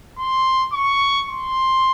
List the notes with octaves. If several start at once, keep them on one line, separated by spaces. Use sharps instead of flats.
C6
C#6
C6